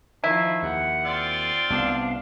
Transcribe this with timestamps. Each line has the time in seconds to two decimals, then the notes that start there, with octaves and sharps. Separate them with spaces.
0.24 D#3 F3 E4
0.63 D#2 F#5
1.05 C4 F4 D5
1.70 C2 B3 D4 F5